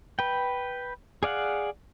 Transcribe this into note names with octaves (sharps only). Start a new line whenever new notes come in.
B4 G5
G#4 D5 F5 F#5